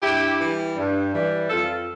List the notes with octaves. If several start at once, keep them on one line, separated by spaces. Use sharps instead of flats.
G2 E4 G4
E3 G3
G2
E3 G3
F2 F4 A4